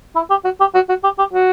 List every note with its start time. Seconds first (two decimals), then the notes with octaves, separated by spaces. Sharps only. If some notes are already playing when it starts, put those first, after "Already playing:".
0.16 E4
0.30 G4
0.44 F#4
0.60 G4
0.75 F#4
0.89 F#4
1.04 G4
1.19 G4
1.33 F#4